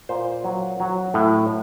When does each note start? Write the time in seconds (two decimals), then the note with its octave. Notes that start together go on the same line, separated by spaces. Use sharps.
0.09 A#2 C5
0.44 F#3
0.80 F#3
1.14 A2